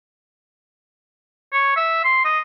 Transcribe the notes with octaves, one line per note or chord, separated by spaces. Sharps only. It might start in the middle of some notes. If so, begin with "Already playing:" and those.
C#5
E5
C6
D#5